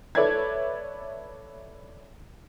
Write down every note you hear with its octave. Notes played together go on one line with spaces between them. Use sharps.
A4 B4 C#5 D5 E5 G#6